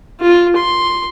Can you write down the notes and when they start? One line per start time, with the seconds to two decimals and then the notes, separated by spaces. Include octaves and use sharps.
0.20 F4
0.56 C6